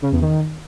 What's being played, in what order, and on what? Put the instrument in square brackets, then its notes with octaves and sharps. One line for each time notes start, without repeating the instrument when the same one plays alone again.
[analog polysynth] C#3
E2
D#3